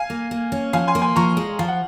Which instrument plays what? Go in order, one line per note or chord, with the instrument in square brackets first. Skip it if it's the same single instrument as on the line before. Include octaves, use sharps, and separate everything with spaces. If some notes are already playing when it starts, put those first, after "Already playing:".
Already playing: [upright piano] F5 G#5
[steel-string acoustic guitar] A#3
A#3
C#4
[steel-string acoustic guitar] F3 [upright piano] F5 G#5
[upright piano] G#5 C6
[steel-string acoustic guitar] A#3
[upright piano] G#5 C6
[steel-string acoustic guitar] F3 [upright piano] A#5 C#6
[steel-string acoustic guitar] G#3
[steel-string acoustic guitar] F3 [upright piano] F5
[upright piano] F#5